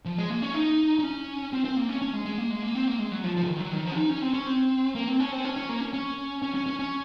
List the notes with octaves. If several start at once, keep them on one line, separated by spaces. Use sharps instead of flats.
F3
G#3
A#3
C#4
D#4
D#4
C#4
C4
C4
A#3
C#4
C#4
G#3
G#3
A#3
G#3
A#3
C4
A#3
G#3
F#3
F3
F3
C#3
D#3
F#3
D#3
F3
C#4
D#4
C#4
C4
C#4
C4
A#3
C4
C#4
C4
C#4
C#4
A#3
C#4
C#4
C#4
C#4
C#4
C#4